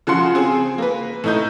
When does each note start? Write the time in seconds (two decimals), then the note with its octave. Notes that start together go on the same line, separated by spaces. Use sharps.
0.07 C#3 F3 F#4 F5 C6 C#7
0.35 C4 G#4
0.78 A#3 B4
1.24 A2 D#4 G6